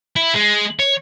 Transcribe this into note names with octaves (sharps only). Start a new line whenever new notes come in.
E4
G#3
C#5